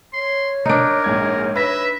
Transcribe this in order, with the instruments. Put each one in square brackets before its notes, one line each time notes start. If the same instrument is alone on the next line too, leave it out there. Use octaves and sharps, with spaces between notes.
[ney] C#5 [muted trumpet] C6
[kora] D4 D#4 [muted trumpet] A#4 [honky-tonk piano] C#7 D7
[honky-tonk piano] A#1 G#2 G#6
[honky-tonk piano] B4 A#6 [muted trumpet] E5